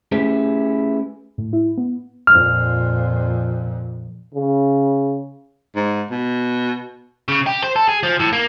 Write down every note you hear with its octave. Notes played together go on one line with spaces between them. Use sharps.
A3 C#4 E4 G4 G#4 B4
A2
E4
B3
F2 A#2 F6
C#3
G#2
B2
C#3
G4
C5
A4
G#4
F3
A2
A#3